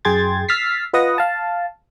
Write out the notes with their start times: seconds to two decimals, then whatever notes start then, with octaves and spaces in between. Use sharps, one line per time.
0.05 F#2 G#4 G5 C6 G#6 A6
0.49 E6 F6 A6 B6 C7
0.93 F4 B4 D#5 F#5 D#6 A#6
1.18 F5 A5